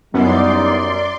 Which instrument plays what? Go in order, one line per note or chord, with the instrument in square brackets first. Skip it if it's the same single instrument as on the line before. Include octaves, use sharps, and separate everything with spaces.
[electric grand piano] F#2 [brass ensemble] G3 D#4 [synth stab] B3 C#4 E4 [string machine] D5 C6